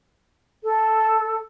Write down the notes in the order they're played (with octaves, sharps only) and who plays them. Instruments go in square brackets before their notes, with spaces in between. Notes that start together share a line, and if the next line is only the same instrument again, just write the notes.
[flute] A4